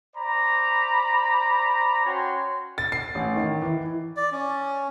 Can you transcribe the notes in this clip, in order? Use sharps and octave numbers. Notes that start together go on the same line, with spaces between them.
C5 D5 A#5 B5
C#4 F#4 C#5 G5 G#5 C6
A6
C7
A1
D#3
E3
D5
C#4